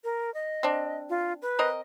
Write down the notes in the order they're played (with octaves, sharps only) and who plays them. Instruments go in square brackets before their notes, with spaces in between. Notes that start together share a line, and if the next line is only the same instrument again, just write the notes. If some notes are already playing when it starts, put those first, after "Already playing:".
[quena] A#4
D#5
[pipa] C4 D4
[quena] F4
B4
[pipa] C4 A#4 D#5